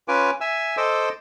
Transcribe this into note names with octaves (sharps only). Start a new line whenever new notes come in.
C#4 F4 B4 G#5 D6
E5 G#5 E6
A4 C5 D#5 D6 E6